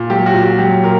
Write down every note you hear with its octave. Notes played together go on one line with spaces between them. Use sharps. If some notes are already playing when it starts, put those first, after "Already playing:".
Already playing: A#2
F#3 G4
F#4
A#2
G4
F#3 G4
A#2 A#4